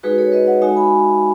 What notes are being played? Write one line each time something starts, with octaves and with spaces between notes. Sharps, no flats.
G#3 D#4 F#4 G#4 B4
A4 C#5
B4 D#5
D#5 F#5
G#3 D#4 F#4 E5 G#5
G#5 B5